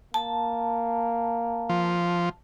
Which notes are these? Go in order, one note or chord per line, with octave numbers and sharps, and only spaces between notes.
A#3 A5
F3